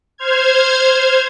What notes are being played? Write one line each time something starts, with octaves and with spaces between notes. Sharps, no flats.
C5 F6 G#6